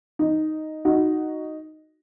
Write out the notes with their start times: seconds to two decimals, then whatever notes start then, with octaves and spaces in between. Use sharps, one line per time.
0.19 D#4
0.85 D#4 F#4